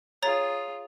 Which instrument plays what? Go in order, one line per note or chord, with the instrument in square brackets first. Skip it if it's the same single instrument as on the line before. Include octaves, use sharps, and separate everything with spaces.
[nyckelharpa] F4 G#4 [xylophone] C#5 A#5 A6